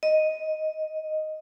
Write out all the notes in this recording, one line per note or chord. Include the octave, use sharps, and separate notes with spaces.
D#5